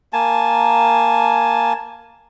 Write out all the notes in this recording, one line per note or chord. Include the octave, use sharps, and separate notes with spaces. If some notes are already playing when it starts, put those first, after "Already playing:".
A#3 G#5 A5